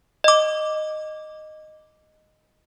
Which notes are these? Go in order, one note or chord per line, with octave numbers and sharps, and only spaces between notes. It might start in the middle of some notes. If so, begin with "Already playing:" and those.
D#5 D6